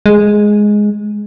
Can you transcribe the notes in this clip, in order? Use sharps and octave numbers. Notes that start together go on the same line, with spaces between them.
G#3